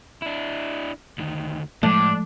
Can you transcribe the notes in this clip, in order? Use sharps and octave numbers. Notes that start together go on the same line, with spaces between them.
D4 E4
D2 D#3
A2 F3 G#3 A3 D4